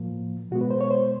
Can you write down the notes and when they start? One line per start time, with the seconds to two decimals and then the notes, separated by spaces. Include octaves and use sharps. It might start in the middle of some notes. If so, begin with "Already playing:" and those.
Already playing: A2 F3 A#3
0.51 B2 G#3 B3 F#4
0.61 B4
0.71 C5
0.81 C#5
0.91 C5